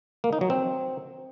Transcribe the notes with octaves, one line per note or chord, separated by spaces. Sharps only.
A#3
D#4
F#3
C4